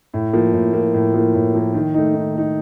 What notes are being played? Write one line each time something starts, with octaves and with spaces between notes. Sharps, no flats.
A2
F3 A#3
A2
F3 A#3
A2
F3 A#3
A2
F3 A#3
D#3
A3 D#4
D#3
A3 D#4